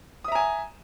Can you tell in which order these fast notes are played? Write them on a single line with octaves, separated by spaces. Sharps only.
D#6 E5 A#5 G#5